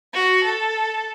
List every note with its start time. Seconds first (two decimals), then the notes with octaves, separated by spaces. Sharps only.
0.14 F#4
0.44 A4